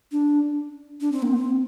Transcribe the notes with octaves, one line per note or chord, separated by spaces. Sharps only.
D4
D4
C4
A#3
C4